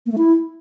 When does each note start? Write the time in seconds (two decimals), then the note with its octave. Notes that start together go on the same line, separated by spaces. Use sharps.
0.06 A#3
0.12 A3
0.18 E4